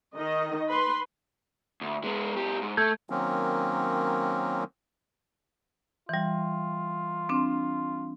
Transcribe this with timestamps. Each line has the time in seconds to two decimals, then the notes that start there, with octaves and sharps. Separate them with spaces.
0.15 D#3 D#5
0.69 B4 C6
1.81 D2
2.04 G#3 B3
2.36 C#2 G4
2.62 G#2
2.77 A3 A4 G6 G#6
3.10 D#3 F#3 A#3 C4 C#4
6.09 E3 G3 F4
7.29 C4 D4